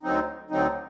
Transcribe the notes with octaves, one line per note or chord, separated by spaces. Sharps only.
D2 D3 F#3 C4 D#4
D2 D3 F#3 C4 D#4